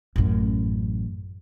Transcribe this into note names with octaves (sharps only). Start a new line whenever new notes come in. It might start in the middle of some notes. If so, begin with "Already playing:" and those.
A1 F#2